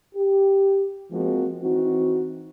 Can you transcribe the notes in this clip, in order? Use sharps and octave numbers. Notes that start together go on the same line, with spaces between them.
G4
F3 G#3 A#3 C4 F#4
E3 C4 D#4 F#4